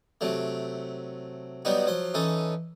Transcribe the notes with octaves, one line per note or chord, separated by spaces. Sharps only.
C3 F#3 A3
F#3 G3 B3 D#4 F#4
F3 F#3 C6
E3 C#4 D#4 A4